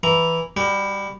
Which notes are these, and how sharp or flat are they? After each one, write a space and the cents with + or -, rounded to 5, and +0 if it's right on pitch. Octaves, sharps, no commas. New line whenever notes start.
E3 +0 A#5 +0
G3 +20 F#4 +45